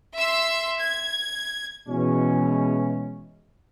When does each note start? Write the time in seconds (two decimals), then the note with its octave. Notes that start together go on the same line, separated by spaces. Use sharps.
0.16 E5 C6 E6
0.80 G#6
1.88 B2 E3 G#3 C#4